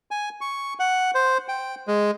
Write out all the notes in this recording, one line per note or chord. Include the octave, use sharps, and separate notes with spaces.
G#5
C#6
F#5
C5
G5
G#3